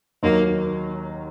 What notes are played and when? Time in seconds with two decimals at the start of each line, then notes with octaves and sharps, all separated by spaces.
0.23 D#2 D#3 F#3 A#3